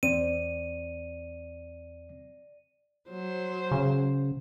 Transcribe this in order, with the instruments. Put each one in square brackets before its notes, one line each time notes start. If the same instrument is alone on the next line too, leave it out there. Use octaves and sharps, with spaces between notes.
[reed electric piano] E2 C4 [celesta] D5 [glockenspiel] D#7
[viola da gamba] F#3 C5
[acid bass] C#3